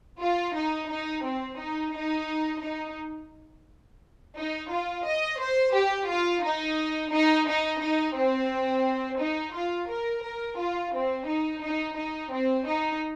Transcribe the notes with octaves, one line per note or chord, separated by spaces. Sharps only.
F4
D#4
D#4
C4
D#4
D#4
D#4
D#4
F4
D#5
C5
G4
F4
D#4
D#4
D#4
D#4
C4
D#4
F4
A#4
A#4
F4
C4
D#4
D#4
D#4
C4
D#4